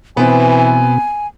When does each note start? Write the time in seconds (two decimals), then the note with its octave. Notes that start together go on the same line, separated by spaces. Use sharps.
0.17 B2 E3 B3 C4 G#5